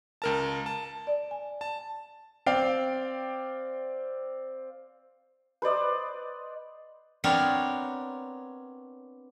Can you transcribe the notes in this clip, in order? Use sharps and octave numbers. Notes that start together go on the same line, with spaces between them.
C#2 A#4 A5
A5
D5
G#5
A5
C4 D5 F5 G5
B4 C5 D5 D#5
B3 C4 D4 A#4 C#5